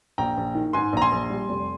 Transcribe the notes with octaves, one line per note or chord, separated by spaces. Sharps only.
A#1 G5 A#5
A#1
D#3
G#2 G#5 C6
A#1 A#5
G#5 C6
A#1
G3
F1